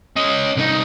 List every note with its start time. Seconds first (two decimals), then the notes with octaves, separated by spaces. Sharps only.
0.16 C#4 D#5
0.56 C2 D#4